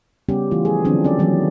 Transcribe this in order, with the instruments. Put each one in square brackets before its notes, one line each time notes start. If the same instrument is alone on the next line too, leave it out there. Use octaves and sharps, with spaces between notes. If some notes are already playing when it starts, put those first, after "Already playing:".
[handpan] C#3 G3 B3 C#4 G4
E3 A3 F4
F3 G#4
D3 E3 F#3 C4 D4
C#4 A4 D5
D#3 E3 F#3 G3 A#3 C#4